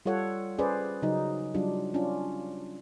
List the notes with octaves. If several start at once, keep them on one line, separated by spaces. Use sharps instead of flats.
G3 F4 A4 C#5 F#5
C#4 G#4 B4 C5 D5
C#3 F#3 D#4
F#3 G3 D4 F4
C#4 D4 F4